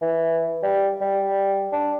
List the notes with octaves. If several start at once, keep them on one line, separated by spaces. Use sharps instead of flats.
E3
G3
G3
D4